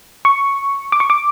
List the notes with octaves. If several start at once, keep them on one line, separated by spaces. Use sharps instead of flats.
C#6
D6
C#6
D6